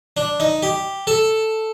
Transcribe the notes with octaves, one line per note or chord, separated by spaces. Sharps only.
D4
D#4
G4
A4